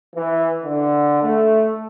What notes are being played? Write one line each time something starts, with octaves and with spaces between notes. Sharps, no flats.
E3
D3
A3